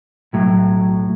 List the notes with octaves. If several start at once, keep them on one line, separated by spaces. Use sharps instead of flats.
B1 A2 F#3